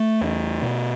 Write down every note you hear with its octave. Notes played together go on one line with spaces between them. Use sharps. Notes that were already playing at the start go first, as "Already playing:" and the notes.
Already playing: A3
E2
B2